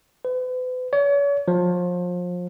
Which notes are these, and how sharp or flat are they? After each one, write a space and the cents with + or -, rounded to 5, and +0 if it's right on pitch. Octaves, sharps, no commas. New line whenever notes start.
B4 +40
C#5 +40
F3 +30